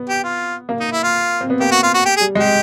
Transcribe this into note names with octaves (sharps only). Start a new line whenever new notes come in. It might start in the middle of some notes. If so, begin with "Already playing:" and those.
Already playing: B3
G4
F4
A#3
D#4
E4
F4
C4
B3
A#3 G4
F#4
F4
F#4
G4
G#4
G3
G#3 G4